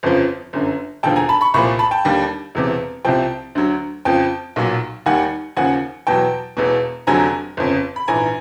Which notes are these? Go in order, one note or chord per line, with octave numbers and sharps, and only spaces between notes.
G1 F2 C#3 F3
G1 F#2 D3
E1 D#2 D3 F3 G5 A5
G#5 A#5
A5 B5
B5 C#6
C2 A#2 F3 B5 C#6
A5 B5
G5 A5
D#2 D3 G3
E1 E2 C3
C2 C3 F3 G5 A5
D2 D3 F#3
F2 C#3 F3 G5 A5
B1 A#2 F#3
D#2 D#3 G3 F#5 G#5
D#2 C#3 F3 F#5 G#5
E2 B2 F#3 G5 A5
E1 E2 B2
F1 F2 D3 F#3 G#5 A#5
G1 F2 C#3
B5
A#1 G#2 E3 G#5 A#5